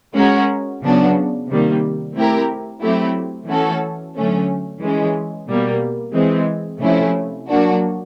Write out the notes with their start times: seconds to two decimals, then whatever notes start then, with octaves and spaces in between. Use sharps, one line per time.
0.15 G#3 C#4 F#4 A#4
0.83 C#3 F#3 B3 D4 F#4
1.49 C3 D#3 G3 A#3
2.15 A3 C4 E4 G4 A#4
2.82 F#3 A3 C4 E4 G4
3.48 E3 A3 C#4 F#4 A4
4.15 D3 F#3 A3 C#4
4.82 E3 G#3 C#4
5.48 B2 G3 A#3
6.14 E3 G#3 C4
6.81 C3 F3 A3 C#4 E4
7.48 F#3 A#3 D4 F#4